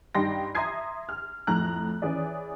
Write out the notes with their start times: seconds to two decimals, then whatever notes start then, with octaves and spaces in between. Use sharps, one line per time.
0.15 G2 D#4 G4 G5 C6 A#6
0.55 E5 A#5 C6 D#6 G#6 C7
1.09 F6
1.47 F2 A2 A#5 F#6
2.02 E3 C#4 G#4 D5